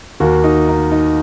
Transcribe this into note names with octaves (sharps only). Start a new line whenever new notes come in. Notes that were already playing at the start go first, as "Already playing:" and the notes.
D#2 D#3 A#3 F#4
D#4
D#4
D#4